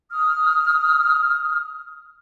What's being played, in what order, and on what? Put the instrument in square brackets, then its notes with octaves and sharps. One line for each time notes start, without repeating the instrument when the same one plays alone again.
[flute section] D#6 F6